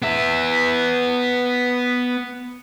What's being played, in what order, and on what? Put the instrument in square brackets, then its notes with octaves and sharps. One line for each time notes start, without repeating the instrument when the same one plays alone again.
[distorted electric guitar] B3 E5